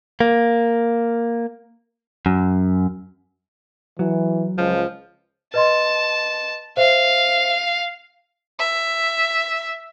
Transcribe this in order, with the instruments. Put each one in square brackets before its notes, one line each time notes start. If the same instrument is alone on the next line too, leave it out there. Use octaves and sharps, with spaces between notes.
[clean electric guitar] A#3
F#2
[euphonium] E3 [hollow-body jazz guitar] F#3
[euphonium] C#2 [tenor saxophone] F3
[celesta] B4 D#5 C6 [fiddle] A5
[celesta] C5 E5 [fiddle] F5
[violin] E5